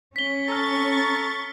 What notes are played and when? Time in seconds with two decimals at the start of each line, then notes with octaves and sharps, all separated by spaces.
0.16 C#4 B6 G7
0.48 A4 A#5 C#6 F6 A6 B6